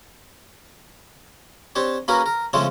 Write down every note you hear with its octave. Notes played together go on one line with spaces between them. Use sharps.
C4 D4 G4 C#5
A#3 C#4 F#4 G#4 A#4 B4
A#4
C#3 F3 G#3 A3 C4 C#4